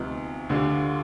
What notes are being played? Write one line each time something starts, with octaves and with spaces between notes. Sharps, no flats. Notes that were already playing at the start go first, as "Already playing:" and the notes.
Already playing: D2 C3 F3 B3 D#4
D2 D3 G3 D4 F4